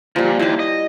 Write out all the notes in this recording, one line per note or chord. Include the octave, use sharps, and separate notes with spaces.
A#2 F3 G3
D#2 E4 A5
D#5